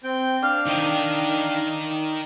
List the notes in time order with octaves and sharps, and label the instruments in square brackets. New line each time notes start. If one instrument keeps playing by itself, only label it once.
[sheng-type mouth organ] C4 G5
[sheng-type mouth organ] D4 F5 [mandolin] F6
[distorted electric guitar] D#3 D#5